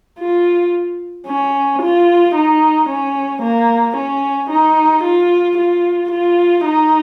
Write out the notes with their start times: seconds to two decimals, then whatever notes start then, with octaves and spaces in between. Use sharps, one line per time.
0.19 F4
1.27 C#4
1.81 F4
2.35 D#4
2.89 C#4
3.42 A#3
3.97 C#4
4.50 D#4
5.03 F4
5.57 F4
6.11 F4
6.65 D#4